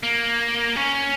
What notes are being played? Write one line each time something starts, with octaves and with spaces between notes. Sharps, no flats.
A#3
C#4